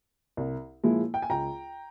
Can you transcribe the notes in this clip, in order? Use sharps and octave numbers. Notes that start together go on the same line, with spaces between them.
C2
A#2 F3 G#3 E4
G5
G#5
C#2 G5 A#5